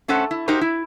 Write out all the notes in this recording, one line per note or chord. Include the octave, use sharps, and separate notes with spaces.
A3 C#4 A4 C5 F#5
E4
D#4 F#4 G4 A#4 C5 A#5
E4